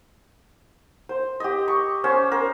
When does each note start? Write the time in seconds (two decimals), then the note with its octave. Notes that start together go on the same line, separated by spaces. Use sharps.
1.09 C5
1.40 G4 D#5
1.68 C#6
2.04 C#4 C5
2.31 A#4 C5